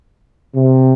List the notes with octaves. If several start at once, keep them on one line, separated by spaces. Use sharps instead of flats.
C3